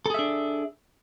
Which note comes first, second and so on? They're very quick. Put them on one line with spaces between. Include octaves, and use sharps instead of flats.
A4 G#4 E5 D4